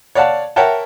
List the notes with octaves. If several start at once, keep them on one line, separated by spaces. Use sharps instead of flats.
C#5 D5 F5 F#5 A5
A#4 C#5 E5 F#5 G5 A5